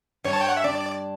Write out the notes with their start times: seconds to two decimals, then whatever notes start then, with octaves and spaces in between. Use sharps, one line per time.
0.24 G2 C#5
0.33 A5
0.41 G5
0.49 F#5
0.57 E5
0.64 D4 D5